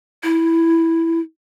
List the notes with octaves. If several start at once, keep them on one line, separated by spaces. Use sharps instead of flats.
E4